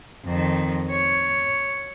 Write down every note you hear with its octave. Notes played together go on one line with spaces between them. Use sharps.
F2 D#3
C#5